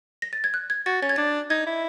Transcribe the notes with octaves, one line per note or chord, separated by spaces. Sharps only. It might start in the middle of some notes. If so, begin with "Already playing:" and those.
A#6
A6
G#6
F#6
G#6
F#4 A6
C#4 A6
G#6
D4 A6
D#4 G#6
E4